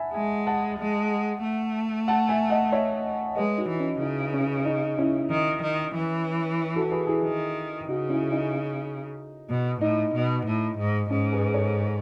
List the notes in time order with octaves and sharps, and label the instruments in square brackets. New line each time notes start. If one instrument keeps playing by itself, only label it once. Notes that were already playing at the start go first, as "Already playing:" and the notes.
Already playing: [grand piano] E5 F#5 G#5 A5 B5
[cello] G#3 [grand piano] E5 G#5
[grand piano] F#5 A5
[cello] G#3
A3
[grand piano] F#5 A5
E5 G#5
D#5 F#5
C#5 E5
[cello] G#3 [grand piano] B4 D#5
[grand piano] D#4 F#4
[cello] E3
[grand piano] C#4 E4
[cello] C#3 [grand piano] D#4
[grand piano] C#4
D#4
C#4 E4
[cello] D#3
D#3
E3
[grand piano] F#4 A4
G#4 B4
E4 G#4
[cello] D#3
[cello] C#3 [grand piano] D#4 F#4
[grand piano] C#4 E4
D#4
[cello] B2
[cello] A2 [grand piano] D#4
[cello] B2
A2
G#2
[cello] G#2 [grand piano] C#4
[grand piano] G#4 B4
A4 C#5